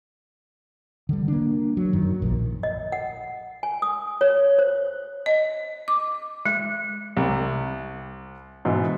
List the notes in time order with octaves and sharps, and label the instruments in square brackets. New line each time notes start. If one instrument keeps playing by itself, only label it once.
[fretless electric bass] D3 G3
A#3 D4
F#3
F#2 D#3
A#1 A#2
[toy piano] D#5
F#5
G#5
D#6
C#5
C5
[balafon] D#5
D6
G#3
[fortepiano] C2 G3
G#2 B2 E3